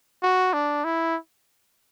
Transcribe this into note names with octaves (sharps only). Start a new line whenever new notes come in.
F#4
D4
E4